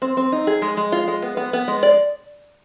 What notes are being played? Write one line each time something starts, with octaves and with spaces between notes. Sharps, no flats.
C4
C4
D#4
G#4
G#3
G#3
F4
G#3
B3
B3
B3
G#3
D5